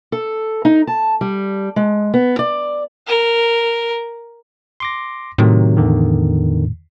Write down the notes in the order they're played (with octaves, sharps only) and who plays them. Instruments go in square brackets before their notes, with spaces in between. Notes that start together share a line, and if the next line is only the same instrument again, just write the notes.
[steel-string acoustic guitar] A4
D#4
A5
G3
G#3
B3
D5
[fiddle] A#4
[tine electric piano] C6 D6 A#6
[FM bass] A2 [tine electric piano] C3 D#3 F#3
[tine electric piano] E2 D3 D#3